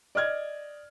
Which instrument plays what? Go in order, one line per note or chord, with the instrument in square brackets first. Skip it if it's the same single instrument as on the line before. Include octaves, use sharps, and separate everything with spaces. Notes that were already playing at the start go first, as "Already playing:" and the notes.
[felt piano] D5 D#5 F6 G#6